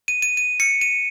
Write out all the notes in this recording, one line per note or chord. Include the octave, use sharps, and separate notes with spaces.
D#7
D#7
D#7
C#7
D#7